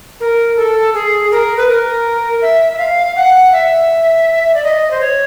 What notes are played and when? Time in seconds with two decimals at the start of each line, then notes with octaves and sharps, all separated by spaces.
0.20 A#4
0.57 A4
0.94 G#4
1.31 A#4
1.57 B4
1.69 A#4
2.42 E5
2.73 E5
2.78 F5
3.16 F#5
3.52 E5
4.54 D5
4.64 D#5
4.91 C5
5.01 C#5